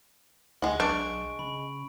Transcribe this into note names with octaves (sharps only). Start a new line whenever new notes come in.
D2 G#3 F#5
B1 D4 C#6 D7
C#3 B5